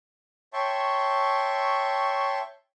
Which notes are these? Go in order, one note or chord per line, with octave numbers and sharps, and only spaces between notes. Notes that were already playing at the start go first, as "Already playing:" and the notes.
C#5 E5 G5 A5 C6 C#6